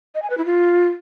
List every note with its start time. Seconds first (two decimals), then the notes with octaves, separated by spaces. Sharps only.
0.15 D#5
0.22 G#5
0.30 B4
0.38 E4
0.45 F4